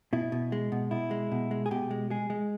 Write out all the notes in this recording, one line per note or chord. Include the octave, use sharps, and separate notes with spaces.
B2 E4
B2
G#3
B2
B2 E4
G#3
B2
G#3
G#4
B2 G4
G#3
G#3 G#4
G#3